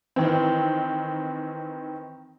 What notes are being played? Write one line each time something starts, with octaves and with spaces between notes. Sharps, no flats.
D#3 E3 C4